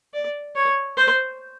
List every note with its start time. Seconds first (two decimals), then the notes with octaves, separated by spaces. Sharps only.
0.14 D5
0.55 C#5
0.97 C5